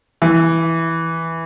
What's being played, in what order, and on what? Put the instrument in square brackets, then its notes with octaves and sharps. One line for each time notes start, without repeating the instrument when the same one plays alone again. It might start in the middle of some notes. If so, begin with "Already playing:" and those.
[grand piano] E3